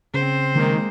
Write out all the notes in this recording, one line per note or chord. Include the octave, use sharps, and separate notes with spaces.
C#3 C4 C5
D#3 G#3 A#3